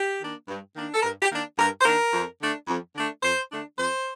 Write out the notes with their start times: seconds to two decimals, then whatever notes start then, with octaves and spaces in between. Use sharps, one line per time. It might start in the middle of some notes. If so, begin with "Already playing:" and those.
Already playing: G4
0.21 D#3 A#3 D4
0.48 G2
0.76 D#3 A#3 D4
0.94 A4
1.03 G2 A#4
1.21 G4
1.31 D#3 A#3 D4
1.58 G2 A#4
1.80 C5
1.85 D#3 A#3 D4 A#4
2.12 F2
2.40 D3 A3 D4
2.68 F2
2.95 D3 A3 D4
3.22 F2 C5
3.50 D3 A3 D4
3.77 F2 C5